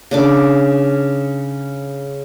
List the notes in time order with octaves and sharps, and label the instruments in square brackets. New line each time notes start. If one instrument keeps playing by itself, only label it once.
[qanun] C#3 D4 D6